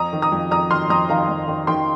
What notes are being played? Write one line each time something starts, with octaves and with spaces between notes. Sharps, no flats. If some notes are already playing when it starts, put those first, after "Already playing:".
Already playing: F2 A#5 D#6
D#3
A#5 D#6
F2
F2 A#5 D#6
D#3 C6 F6
F2 A#5 D#6
D#3 F5 A#5
F2
D#3
D#3 G5 C6